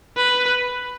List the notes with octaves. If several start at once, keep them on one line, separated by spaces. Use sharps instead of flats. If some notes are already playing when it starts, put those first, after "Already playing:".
B4